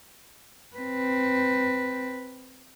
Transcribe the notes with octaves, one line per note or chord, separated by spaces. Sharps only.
C4 B4